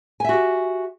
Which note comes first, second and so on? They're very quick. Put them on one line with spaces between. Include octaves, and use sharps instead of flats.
G#5 E5 F#4 G4